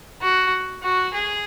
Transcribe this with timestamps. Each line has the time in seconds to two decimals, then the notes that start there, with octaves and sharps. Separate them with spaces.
0.22 F#4
0.83 F#4
1.14 G#4